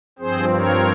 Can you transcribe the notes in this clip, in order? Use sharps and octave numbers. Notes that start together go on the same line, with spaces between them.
G2 F3 C4 G#4 C5
A#4 C#5